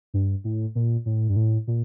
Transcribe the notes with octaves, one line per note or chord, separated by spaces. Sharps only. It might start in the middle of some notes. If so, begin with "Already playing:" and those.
G2
A2
A#2
A2
G2
A2
A#2